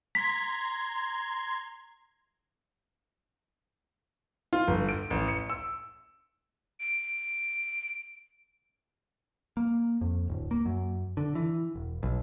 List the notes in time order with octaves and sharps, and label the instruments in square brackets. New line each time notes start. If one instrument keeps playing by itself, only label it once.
[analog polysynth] A#5 C6 G#6 [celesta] B6
[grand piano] F4
G1
D7
A1
C#7
E6
[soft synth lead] D7
[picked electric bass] A#3
F2
D1
A#3
F#2
D3
E3
E1
B1